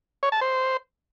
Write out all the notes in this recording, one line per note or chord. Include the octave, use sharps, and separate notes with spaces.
C#5
A5
C5